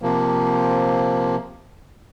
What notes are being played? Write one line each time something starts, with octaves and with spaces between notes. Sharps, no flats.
C3 F3 A#3